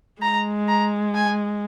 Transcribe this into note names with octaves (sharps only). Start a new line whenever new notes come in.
G#3 A#5
A#5
G#5